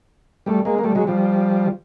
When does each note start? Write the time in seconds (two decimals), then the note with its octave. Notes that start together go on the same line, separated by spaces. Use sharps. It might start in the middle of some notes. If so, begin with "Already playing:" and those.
0.46 G3 A3
0.65 G#3 A#3
0.79 A#3
0.84 G3 A3
0.95 F#3 G#3
1.07 F3 G3